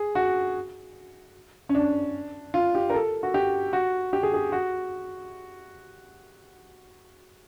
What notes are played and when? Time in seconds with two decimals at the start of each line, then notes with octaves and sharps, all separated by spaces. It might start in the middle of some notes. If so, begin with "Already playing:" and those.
Already playing: G#4
0.15 F#4
1.69 C#4
1.75 D4
2.54 F4
2.75 G4
2.90 A#4
2.95 A4
3.23 F#4
3.34 G4
3.73 F#4
4.13 G4
4.23 G#4
4.34 G#4
4.52 F#4